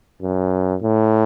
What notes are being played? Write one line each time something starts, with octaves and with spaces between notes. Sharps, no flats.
F#2
A2